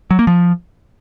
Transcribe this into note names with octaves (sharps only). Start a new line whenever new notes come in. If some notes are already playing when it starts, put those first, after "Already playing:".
F#3
A#3
F3